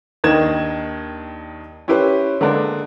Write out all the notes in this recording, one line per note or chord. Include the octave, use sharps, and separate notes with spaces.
D#2 D#3 D4 D#5 G#6 E7
C#4 E4 G4 B4 C5
D3 G#3 A#3 D4 B4